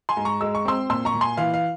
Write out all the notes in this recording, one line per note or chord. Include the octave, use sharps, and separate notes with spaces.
G#5 C6
G#2
A#5 C#6
G#3 E6
C#6
C4 C6 E6
A#2 C6 E6
A#5 C#6
A#2
G#5 C6
E3 F5
F5